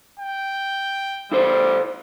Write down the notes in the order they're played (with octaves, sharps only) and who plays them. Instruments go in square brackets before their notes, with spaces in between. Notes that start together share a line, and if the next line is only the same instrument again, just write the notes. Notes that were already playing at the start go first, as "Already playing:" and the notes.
[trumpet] G5
[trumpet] G3 [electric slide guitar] E4 A4 C5